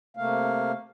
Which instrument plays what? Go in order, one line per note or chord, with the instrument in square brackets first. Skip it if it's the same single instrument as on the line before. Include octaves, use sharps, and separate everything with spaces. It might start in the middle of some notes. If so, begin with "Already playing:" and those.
[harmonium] C3 A3 A#3 F5